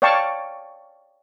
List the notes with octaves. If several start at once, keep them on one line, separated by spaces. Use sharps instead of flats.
C#5 D5 F5 G5 A5 C#6